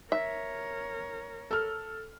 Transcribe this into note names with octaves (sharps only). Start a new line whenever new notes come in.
A#4 C#5 E5
A4 F6